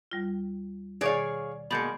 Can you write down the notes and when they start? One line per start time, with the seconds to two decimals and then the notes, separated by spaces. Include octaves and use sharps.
0.11 D#2 G3 F4
1.01 B2 D#3 G#4 C#5 D5 F5 A#6
1.71 B2 G#3 A#3 B5 G6 C#7